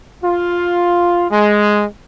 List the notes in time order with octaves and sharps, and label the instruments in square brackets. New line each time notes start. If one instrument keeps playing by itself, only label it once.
[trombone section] F4
G#3